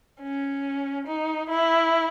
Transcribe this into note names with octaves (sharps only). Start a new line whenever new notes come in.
C#4
D#4
E4